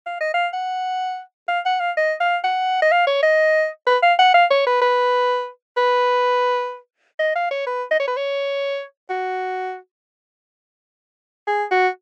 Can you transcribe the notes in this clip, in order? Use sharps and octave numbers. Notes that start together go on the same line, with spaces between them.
F5
D#5
F5
F#5
F5
F#5
F5
D#5
F5
F#5
D#5
F5
C#5
D#5
B4
F5
F#5
F5
C#5
B4
B4
B4
D#5
F5
C#5
B4
D#5
C#5
B4
C#5
F#4
G#4
F#4